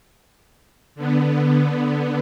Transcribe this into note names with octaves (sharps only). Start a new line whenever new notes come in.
D3 B3